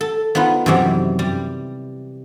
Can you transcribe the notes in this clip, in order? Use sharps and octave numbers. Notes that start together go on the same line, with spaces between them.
A4
B3 D#4 F4 B4
F#2 C3 E3 G3
G3